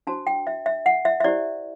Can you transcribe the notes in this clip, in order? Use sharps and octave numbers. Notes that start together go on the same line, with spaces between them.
D4 F#4 C5 A5
G5
E5
E5
F#5
E5
E5
E4 G4 C5 D5